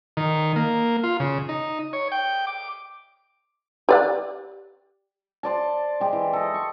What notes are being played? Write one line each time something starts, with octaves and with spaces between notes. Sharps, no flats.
D#3
A#3
F4
C#3
D#4
C#5
G5
D6
G4 D5 F#5
C5 D5 A5
G#3 G4
E3
A4 D#5
C#6